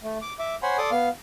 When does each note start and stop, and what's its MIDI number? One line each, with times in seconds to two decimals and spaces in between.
0.03 0.18 57
0.22 0.34 86
0.39 0.55 76
0.39 0.55 86
0.63 0.78 72
0.63 0.78 73
0.63 0.78 78
0.63 0.78 80
0.63 0.78 83
0.63 0.78 84
0.78 0.90 69
0.78 0.90 74
0.78 0.90 84
0.78 0.90 86
0.78 0.90 87
0.91 1.09 59
0.91 1.09 77
0.91 1.09 89